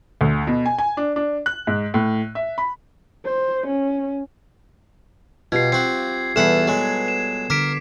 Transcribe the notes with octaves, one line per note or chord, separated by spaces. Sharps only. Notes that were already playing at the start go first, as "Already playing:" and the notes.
D2
B2
G#5
G#5
D4
D4
F#6
G#2
A2
E5
B5
C5
C#4
B2 F4 G4 G#6 C7
C4 F#4 C7
E2 G3 B3 A4 F#5 B5 C7 E7
F#3 G#3
E7
D3 A#4 D6 B6 D7